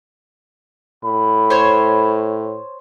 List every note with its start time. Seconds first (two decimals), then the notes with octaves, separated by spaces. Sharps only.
1.05 A2 B5
1.50 C5 C#5